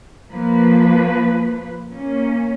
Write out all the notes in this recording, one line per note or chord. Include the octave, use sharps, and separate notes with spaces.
F3 A#3 B4
A#3 C#4